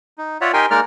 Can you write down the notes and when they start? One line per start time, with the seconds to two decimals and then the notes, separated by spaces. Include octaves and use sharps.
0.18 D#4
0.41 F4 C#5 D5 E5 F#5
0.54 D#4 G4 A#4 G5 G#5 C6
0.71 G#3 A#3 D#4 A#4 D5 F6